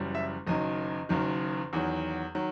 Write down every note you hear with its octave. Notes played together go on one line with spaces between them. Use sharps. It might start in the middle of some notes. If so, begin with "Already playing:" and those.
Already playing: F#1 F#2 E3 G3
E5
F#1 F#2 D#3 D#5
F#1 F#2 D#3
E2 D#3 F#3
D#3 F#3